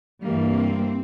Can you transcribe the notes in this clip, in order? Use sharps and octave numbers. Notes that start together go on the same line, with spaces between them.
G2 E3 G3 A#3
C4